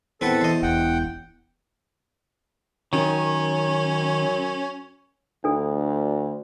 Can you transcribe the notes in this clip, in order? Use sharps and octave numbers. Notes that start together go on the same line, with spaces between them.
E2 C4 A4 B4 F#5
C5 D#5
E1 F#5 G5
F#2 D#3 C#4
D2 D4 A4